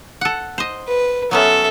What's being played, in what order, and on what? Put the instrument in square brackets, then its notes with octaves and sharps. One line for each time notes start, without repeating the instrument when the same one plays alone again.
[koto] A4 F#5
C5 D#5
[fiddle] B4
[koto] F#3 B3 C#4 [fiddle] A4 E5